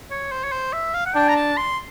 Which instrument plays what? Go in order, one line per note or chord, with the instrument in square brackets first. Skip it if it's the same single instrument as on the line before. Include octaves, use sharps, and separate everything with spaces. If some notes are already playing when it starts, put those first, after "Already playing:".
[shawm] C#5
C5
C#5
C5
E5
F5
F#5
[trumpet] D4 [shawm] G5
[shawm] A#5
A5
C6